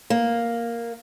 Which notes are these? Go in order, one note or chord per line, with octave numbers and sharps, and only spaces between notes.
A#3